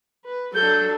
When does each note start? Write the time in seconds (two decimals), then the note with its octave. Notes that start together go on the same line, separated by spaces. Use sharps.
0.24 B4
0.54 F#3 D4 A4 G6